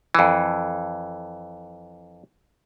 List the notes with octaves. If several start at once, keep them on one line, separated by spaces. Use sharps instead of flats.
F2 E3